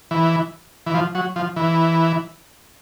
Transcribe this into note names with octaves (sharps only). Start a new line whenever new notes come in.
E3
E3
F3
F#3
F3
E3